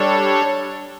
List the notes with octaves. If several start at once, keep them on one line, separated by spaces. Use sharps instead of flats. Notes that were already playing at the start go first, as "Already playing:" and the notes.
Already playing: G3 D4 A4 C#5